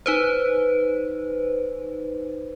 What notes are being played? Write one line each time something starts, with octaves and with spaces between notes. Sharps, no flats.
D#4 B4 C5